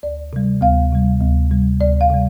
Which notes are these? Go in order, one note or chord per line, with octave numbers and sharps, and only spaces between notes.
D2 D5
C3 G3
D2 F5
C3 G3
D2
C3 G3
D2 D5
F5
C3 G3